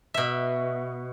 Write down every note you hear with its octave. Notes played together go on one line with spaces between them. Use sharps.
B2 E5